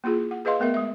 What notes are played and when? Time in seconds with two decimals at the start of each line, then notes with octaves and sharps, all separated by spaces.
0.04 A#3 E4 F4 G#4
0.31 F#5
0.45 G#4 B4 D#5 F5 C6
0.60 A3 B3 A#4 E5
0.74 G#3 E5